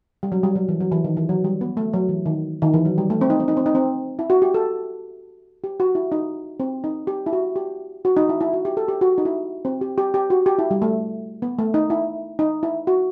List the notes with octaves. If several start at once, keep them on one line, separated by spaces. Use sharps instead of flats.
G3
F#3
G3
F#3
E3
F#3
E3
D#3
E3
F#3
G3
B3
A3
F#3
E3
D#3
D#3
E3
F#3
G3
A3
C4
D#4
C4
D#4
C4
D#4
C4
E4
F#4
G4
A4
G4
F#4
E4
D#4
C4
D#4
G4
E4
F#4
G4
F#4
D#4
E4
E4
F#4
G4
A4
G4
F#4
D#4
E4
C4
G4
G4
G4
F#4
G4
E4
G3
A3
B3
A3
D#4
E4
D#4
E4
F#4